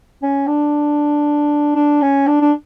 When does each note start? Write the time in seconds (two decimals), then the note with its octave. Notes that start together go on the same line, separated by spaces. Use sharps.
0.22 C#4
0.47 D4
1.76 D4
2.02 C#4
2.27 D4
2.41 D4